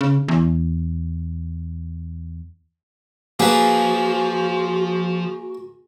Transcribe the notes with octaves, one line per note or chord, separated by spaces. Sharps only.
C#3
E2
F3 A#3 F#4 G#4 B4 A5